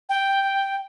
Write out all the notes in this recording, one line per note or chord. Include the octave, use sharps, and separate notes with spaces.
G5